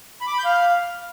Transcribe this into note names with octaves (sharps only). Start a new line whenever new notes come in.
B5
D6
B5
G6
F5